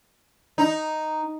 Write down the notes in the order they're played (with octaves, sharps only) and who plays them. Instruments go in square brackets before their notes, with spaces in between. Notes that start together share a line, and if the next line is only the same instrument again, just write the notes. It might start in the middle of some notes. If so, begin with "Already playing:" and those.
[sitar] D#4